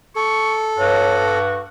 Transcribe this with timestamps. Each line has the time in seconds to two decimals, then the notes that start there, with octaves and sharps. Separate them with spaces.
0.16 A4 C#6
0.78 G2 F#4 C#5
1.26 C#6